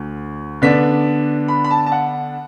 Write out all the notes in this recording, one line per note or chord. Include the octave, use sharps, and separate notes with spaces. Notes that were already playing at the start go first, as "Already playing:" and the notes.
Already playing: D2 D3
D3 B3 D4 B6
B5
B5
A5
A5
F#5